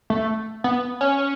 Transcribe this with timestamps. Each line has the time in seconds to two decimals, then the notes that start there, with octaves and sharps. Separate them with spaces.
0.10 A3
0.64 B3
1.01 C#4